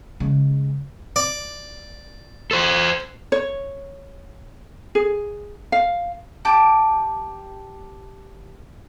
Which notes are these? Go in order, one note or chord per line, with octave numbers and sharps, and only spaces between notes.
C#3 G#3
D5
A4 C5
C#5
G#4
F5
G4 A5 D6